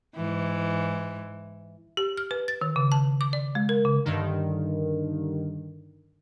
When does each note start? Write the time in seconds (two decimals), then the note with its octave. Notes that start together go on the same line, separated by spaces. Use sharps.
0.15 G#2 E3
1.97 G4
2.17 F6
2.31 B4
2.48 A6
2.61 D#3
2.76 C#3
2.92 A5
3.21 D6
3.33 D5
3.55 G#3
3.69 A#4
3.85 C#3
4.05 G2 D3 D#3